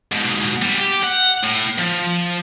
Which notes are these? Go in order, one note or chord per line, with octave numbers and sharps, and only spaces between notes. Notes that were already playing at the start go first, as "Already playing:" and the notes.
G#2 B2
G3 B3
G4
F#5
A2
F3